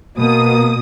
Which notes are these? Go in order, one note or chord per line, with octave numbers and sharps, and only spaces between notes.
B2 A#3 D#6